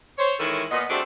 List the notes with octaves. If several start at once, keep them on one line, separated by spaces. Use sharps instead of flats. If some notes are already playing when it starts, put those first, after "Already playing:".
C5 C#5
D#3 E3 G#3 C#4 E4 A4
A#2 B3 D#5
G3 A3 C4 D4 F#4 G#4